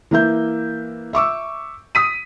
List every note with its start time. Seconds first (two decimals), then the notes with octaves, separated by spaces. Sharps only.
0.11 E3 A#3 E5 G6
1.13 E5 C#6 D6 E6
1.95 D#6 B6 D#7